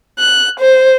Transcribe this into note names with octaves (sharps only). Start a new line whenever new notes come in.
F#6
C5